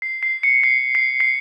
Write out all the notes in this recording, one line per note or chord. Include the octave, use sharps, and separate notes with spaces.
C7
C7
C#7
C7
C7
C7